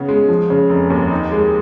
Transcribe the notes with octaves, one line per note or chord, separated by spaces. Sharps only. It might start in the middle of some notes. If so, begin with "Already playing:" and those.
Already playing: C#3 B3
G#3
F3
C#3
F1
D#2
D#4
G#3